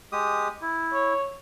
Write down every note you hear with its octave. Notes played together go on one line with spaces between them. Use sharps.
G#3 G4 D#6
E4
C#5